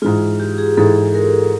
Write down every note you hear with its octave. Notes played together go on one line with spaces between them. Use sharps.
G#2 E3 G#3 F4
G4
G#4
G#2 E3 G#3 A4
A4
A#4